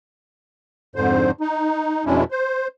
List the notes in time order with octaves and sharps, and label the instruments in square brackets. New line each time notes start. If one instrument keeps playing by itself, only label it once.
[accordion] F2 G#2 D3 C5
D#4
F2 B2 G#3 C#4 D4 E4
C5